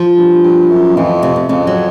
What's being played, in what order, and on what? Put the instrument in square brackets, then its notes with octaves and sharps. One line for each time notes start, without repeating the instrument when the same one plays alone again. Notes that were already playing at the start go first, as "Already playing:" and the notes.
Already playing: [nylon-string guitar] F3
[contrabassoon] G2
G2
F#2
[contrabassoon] F2 [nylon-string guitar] E3
[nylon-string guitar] C3
C3
[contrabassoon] F2 [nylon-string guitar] C#3
[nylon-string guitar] F#3